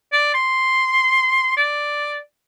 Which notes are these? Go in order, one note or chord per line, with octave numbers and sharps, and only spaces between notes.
D5
C6
D5